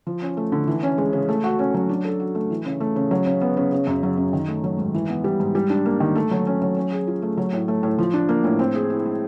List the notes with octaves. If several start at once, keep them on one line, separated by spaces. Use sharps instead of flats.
F3
C#4
A3
D3
E3
C#4
G#3
C#3
A3
F#4
C#4
F#3
D4
A4
F#4
A3
E3
C#3
A3
C#3
F#3
C#3
B3
C#3
C#3
F#2
F#3
F#2
D#3
A3
F#3
G#2
E3
B3
G3
G#2
G3
D4
A#3
D#3
A3
F#3
C#4
F#3
C#4
G#4
F4
A3
F#3
A2
A3
A2
F3
D4
A#3
A2
C4
G#4
E4
G#3